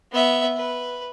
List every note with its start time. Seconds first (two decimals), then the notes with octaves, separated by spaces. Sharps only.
0.12 B3 E5
0.57 B4